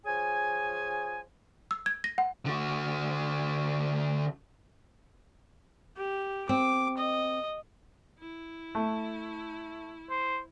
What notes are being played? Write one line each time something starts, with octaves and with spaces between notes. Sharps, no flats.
F3 G#4 C#5 G#5
E6
G#6
A#6
F#5
D3 F#4
G4
C4 D6
D#5
E4
A3
C5